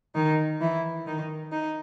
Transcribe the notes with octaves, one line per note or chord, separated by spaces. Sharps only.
D#3 D#4
E3 E4
D#3 D#4
D#4